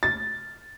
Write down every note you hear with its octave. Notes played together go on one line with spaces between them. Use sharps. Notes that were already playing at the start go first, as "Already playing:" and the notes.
A6